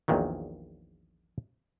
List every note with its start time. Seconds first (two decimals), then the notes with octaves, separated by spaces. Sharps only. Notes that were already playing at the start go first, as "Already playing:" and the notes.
0.08 A#1 E2 A#2 D#3 F#3